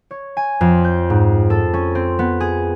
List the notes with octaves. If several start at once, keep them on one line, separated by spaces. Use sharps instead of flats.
C#5
G#5
F2
G6
G#2
A4
C#4
C4
B3
G#4